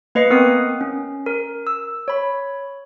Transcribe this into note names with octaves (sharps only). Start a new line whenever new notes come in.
A#3 B4 D#5 C7 C#7
B3 C4 A#4 F#5 D#6 C7
C#4
A#4
E6
C#5 B5